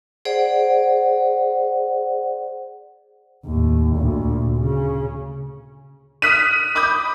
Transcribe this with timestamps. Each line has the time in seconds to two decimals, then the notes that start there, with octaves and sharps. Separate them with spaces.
0.25 G#4 C5 D5 F#5
3.45 D#2 A2
3.96 D2 A#2
4.60 C#3
6.22 D#6 F6 F#6 B6 D#7
6.75 B5 D6 D#6 G6